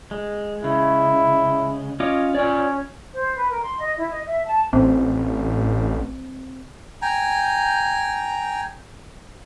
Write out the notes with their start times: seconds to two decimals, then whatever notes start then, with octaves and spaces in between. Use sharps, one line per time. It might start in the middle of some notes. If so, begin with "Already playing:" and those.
0.11 G#3
0.64 C#3 E4
2.00 C#4 F4 D#5 D6
2.35 C#4 F4 C#5 D5
3.12 C5
3.35 B4
3.49 A#4
3.62 C6
3.80 D#5
3.96 E4
4.11 D#5
4.25 E5
4.44 A5
4.73 A1 C4
7.02 G5 G#5 A#5